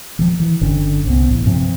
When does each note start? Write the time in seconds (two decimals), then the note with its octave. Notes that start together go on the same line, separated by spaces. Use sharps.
0.19 D#3 F3
0.40 E3
0.61 G1 D3 C#4
1.06 C2 B3
1.28 A1 E3
1.45 G2 C3 F3 C4